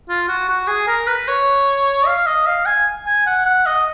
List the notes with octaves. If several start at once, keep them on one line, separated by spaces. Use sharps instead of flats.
F4
F#4
F#4
G#4
A#4
B4
C#5
F5
D#5
F5
G#5
G#5
F#5
F#5
D#5